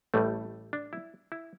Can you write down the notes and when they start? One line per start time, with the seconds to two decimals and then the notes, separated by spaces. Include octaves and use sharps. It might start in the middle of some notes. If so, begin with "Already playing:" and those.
0.14 A1 A2 G3 A3
0.73 D4
0.93 E4
1.32 E4